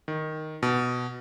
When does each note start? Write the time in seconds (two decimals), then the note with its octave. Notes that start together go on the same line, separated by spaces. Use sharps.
0.08 D#3
0.63 B2